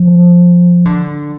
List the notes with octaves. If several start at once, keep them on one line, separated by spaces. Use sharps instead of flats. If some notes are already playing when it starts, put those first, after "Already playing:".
Already playing: F3
D3